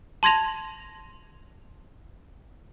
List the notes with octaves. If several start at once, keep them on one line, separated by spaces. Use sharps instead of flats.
A5 C6 G#6 A#6 F7